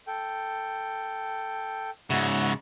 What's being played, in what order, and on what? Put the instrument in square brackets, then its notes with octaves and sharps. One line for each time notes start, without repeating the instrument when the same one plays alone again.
[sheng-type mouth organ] A4 G5
[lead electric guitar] G#2 C#3 [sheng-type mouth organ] F#4 E5 F#5